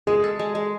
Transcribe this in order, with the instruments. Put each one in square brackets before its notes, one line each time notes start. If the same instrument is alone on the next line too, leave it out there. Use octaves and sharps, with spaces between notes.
[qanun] G#3 [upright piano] G#4
[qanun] A4
G#3
G#3